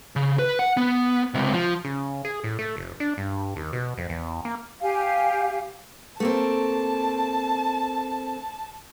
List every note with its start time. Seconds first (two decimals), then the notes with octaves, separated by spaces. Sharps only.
0.16 C#3
0.39 B4
0.59 F#5
0.77 B3
1.34 C#2 C3
1.54 F3
1.85 C#3
2.25 G#4
2.44 A2
2.59 A3
2.77 F1
3.00 D4
3.17 G2
3.56 D#2
3.73 B2
3.98 F2
4.10 E2
4.45 A#3
4.81 G4 F5 G#5
6.20 A3 A#3 C4 A5